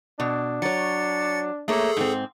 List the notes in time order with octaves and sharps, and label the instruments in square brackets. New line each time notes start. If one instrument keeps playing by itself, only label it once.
[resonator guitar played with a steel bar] B2 [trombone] D4
[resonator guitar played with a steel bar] F#3 C#5 [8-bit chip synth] A6 C#7
[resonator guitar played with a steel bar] A3 A#3 C#5 [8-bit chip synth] G#4 A4
[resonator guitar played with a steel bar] G#2 C4